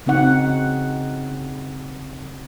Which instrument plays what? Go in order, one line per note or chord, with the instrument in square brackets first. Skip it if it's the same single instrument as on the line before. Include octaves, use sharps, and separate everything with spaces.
[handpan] C#3 C4 D#4 F#5